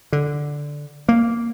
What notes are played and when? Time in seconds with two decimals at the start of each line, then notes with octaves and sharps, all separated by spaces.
0.12 D3
1.09 A#3